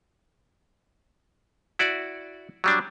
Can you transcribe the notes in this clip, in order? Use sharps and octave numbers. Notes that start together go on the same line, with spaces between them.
E4 F#4 D5
F#3 G3 D4